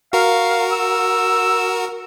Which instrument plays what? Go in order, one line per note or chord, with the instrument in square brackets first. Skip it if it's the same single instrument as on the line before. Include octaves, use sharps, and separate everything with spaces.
[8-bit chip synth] F#4 A#4 [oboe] F5
[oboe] E6